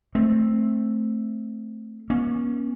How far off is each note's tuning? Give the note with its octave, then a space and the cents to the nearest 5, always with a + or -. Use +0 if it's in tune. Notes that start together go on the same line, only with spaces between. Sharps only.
A3 +0 C4 +5
A#3 +45 C#4 +0